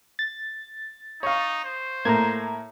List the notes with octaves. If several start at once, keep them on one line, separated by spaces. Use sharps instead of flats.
A6
D#4 C#5 F5
C5
A2 A#3 A#5 G#6